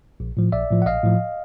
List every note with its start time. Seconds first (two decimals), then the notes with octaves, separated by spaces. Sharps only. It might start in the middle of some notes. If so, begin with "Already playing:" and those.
0.20 A#1
0.37 A2 F3
0.52 A#1 D5 E5
0.70 A2 F3
0.82 F#5
0.86 A#1 D#5 F5
1.03 A2 F3